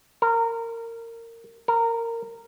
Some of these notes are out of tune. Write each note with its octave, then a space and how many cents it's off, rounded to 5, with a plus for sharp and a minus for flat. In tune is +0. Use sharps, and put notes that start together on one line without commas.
A#4 -20
A#4 -15